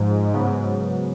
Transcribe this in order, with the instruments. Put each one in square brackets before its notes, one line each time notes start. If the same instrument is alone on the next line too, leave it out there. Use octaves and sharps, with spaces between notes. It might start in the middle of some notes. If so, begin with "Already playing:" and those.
Already playing: [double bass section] G#2 [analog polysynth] F3 G#3 D#4
[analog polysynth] C#3 F#3 B3